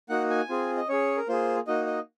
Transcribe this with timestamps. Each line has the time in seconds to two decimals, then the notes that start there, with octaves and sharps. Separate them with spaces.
0.09 A#3 D#4 F#4 F#5
0.30 G#5
0.49 C4 F4 G#4
0.77 D#5
0.88 C#4 G#4 C#5
1.17 A#4
1.28 A#3 F4 G#4 C5
1.67 A#3 D#4 F#4 D#5
1.86 D#5